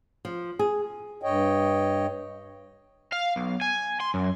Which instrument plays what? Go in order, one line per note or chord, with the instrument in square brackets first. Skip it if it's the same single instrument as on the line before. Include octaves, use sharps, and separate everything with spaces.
[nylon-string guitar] F3
G#4
[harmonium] G2 C#5 D#5 G5
[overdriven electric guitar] F5
B1
G#5
C6
F#2